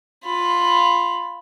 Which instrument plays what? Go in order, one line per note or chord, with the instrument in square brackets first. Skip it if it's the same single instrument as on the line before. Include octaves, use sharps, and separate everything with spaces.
[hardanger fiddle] F4 B5